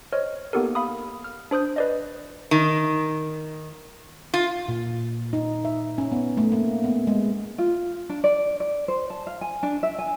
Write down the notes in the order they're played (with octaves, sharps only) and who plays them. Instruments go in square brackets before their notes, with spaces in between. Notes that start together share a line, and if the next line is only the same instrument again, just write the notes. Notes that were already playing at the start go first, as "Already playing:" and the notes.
[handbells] C5 C#5 D#5 F6
A#3 B3 D#4 G4 A4 A#4
F5 B5 D#6
F6
D4 C5 D#6 G6
B4 D5 D#5
[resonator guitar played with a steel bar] D#3
F4
[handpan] A#2
D#4
E5
C#4
B3
A3
A#3
B3
G#3
[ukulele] F4
D4
D5
D5
C5
A5
F5
G#5
D4
E5
G#5